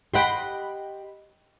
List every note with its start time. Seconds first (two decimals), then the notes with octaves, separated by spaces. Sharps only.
0.14 G4 D#5 F#5 G5 B5 C6